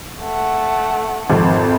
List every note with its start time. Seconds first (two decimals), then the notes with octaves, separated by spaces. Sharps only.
0.21 A3 F#5
1.30 G#1 F2